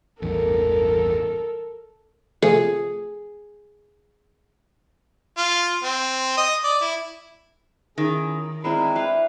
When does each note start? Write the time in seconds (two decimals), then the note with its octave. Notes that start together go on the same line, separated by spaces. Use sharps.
0.22 A1 E2 G2 A4 A#4
2.42 C3 F3 A3 G#4
5.37 F4
5.83 C4
6.37 D#5
6.64 D5
6.81 E4
7.98 D#3 C#4 E4 G#4
8.64 G#3 C4 D4 E4 A#5
8.95 B4 E5 F5 G5